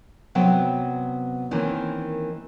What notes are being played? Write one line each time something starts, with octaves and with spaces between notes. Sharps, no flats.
C3 F#3 B3 B4 G5
D#3 E3 A#3 C4 C#4